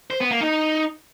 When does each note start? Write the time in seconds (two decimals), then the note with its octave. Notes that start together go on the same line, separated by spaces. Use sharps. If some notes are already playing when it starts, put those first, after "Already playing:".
0.11 C5
0.21 B3
0.31 A#3
0.41 D#4